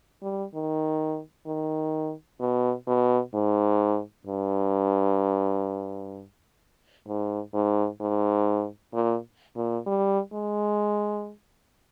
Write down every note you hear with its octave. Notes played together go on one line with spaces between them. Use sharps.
G3
D#3
D#3
B2
B2
G#2
G2
G#2
G#2
G#2
A#2
A#2
G3
G#3